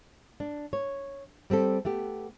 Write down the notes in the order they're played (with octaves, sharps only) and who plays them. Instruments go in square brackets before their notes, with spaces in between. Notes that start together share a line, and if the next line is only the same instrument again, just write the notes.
[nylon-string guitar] D4
C#5
G3 C4 G4 A4
A3 B3 G4